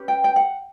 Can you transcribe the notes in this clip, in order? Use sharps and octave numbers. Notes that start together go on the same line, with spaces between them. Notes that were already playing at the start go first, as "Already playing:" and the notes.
Already playing: C#4 G4 B4
G5
G5
F#5